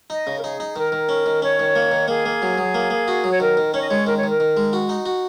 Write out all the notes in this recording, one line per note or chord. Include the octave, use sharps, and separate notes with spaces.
D#4 D#5
C#3
A#4
D#4 G#4
D#4
D#3 A#4
D#3
C#4
D#3
C#4 C#5
D#3
A#3
D#3
A#3 G#4
A#3
F#3
F#3
A#3
A#3
F#4
F#3
C#5
D#3 A#4
D#3
C#4 C#5
D#5
G#3 C#5
D#3 A#4
C#5
D#3
A#4
D#3
G#3
F#4
D#4
F#4